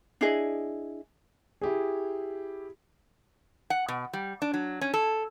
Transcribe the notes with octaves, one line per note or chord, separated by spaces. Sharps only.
D4 E4 G#4 D#5
E4 G4 G#4
F#5
B2
G3
D4
F#3
C#4
A4